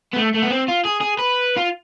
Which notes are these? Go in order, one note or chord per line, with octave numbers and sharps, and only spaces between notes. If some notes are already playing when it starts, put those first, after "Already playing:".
B3
A3
A3
B3
C4
F4
G#4
G#4
B4
F4